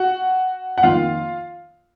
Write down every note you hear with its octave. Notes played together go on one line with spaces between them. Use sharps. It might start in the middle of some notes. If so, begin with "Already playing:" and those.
Already playing: F#4 F#5
F#5
F2 D#3 A#3 F4 F5